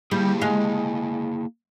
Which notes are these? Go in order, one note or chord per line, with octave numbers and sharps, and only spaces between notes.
G3 A#3 E4 G#4
G#3 F5